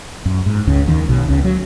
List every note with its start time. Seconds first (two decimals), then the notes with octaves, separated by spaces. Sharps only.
0.25 F#2
0.46 G#2
0.67 C#2 C#3
0.88 D#2 D#3
1.09 B1 B2
1.28 C#2 C#3
1.45 F#3